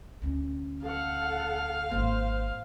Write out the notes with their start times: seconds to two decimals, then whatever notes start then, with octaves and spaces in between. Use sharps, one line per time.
0.22 D2 C#4
0.83 A4 F5 F#5
1.91 G#1 A#3 C5